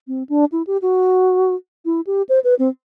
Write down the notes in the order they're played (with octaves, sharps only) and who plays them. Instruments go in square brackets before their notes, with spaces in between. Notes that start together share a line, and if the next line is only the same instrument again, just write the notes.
[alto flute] C4
D4
E4
G4
F#4
E4
G4
C5
B4
C4